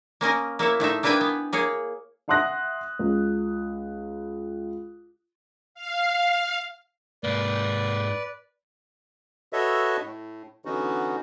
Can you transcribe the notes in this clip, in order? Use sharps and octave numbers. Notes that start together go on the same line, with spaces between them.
A#3 C#4 A#4 D#5
A#3 E4 C#5 E5
A2 A3 D#4 E5
A#3 D4 E4 B4 G5 G#5
B3
A#3 G#4 C#5
E5 F#5 C6 D#6 F#6 A#6
C#2
F5
G#2 A#3 B4 D5
F#4 A4 B4 C#5 D#5 E5
A2
D3 E3 B3 C#4 D#4 F#4